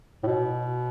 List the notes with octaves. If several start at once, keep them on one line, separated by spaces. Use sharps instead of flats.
A2
B2